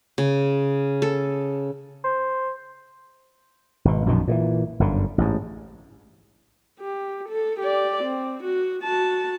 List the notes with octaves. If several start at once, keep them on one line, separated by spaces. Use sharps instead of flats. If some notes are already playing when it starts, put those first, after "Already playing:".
C#3
A4
C5
G#1 B2
A#1 F#2 B2 D#3
A#2 C#3 E3
G1 F#2 D3
A1 G#2
G4
A4
G4 D5
C4
F#4
F#4 A5